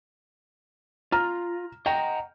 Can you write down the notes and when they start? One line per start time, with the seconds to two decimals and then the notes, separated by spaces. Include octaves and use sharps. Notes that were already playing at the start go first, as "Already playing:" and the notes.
1.12 F4 A#5 F6
1.86 D#5 F#5 G5 A#5